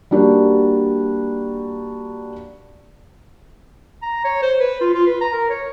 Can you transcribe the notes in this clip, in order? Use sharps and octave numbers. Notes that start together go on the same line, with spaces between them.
G3 A#3 D4 F#4 G4
A#5
C#5
C5
B4
F4
F4
B4
A#5
A#4
C#5